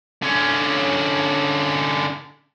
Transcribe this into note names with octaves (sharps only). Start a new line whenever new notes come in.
D3 C#4